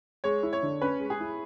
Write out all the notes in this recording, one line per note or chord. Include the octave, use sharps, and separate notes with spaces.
G#3 C#5
E4
C#5
D3
C#4 B4
G#3
G#4
E4